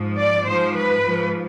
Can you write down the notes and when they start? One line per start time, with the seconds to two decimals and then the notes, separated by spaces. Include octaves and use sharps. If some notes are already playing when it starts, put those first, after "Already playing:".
Already playing: G#2 F3
0.19 D5
0.47 G#2 F3 C5
0.75 B4
1.03 G#2 F3